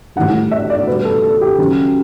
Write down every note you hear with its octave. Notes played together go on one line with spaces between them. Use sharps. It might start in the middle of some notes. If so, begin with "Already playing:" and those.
A2 E3 G3 F#5
E5
D5
B2 G3 B4
A4
A4
G4
C#3 F#3